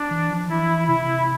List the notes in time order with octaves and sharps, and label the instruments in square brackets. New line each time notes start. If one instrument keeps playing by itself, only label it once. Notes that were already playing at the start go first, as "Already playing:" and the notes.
Already playing: [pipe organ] D4
[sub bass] E3
F3
[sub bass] E3 [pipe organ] E4
[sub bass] C3 [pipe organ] E4